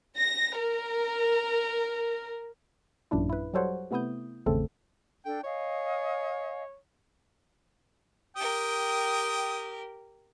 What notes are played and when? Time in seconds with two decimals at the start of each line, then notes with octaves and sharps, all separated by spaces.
0.16 A#6
0.59 A#4
3.11 A1 F#2 A#2 D4 E4
3.29 E4 B4
3.54 F#3 G3 A4 C5 C#5 F#5
3.91 C3 A3 B3 E4 D#6 G6
4.46 G#1 E2 C#3 A3 C4 A4
5.25 D4 A4 G5
5.44 C#5 D#5 F5 G#5
8.37 G4 A#4 G5 D#6